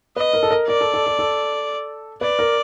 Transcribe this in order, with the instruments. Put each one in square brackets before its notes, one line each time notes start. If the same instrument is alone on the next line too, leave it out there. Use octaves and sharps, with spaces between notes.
[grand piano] B4 [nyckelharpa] D#5
[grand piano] A#4
A4
A#4
[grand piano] A#4 [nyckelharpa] D5
[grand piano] A4
A4
A4
A4
[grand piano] B4 [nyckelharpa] D5
[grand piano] A#4